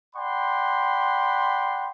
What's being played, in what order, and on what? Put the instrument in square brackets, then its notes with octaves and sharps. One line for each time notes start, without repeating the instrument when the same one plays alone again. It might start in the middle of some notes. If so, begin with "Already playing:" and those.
[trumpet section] D5 F#5 G5 B5 C6